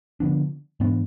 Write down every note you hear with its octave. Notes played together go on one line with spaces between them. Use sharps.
D3 F3 B3 D4
G#2 E3 B3 D4